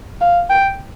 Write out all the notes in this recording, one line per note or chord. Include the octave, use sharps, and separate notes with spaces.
F5
G5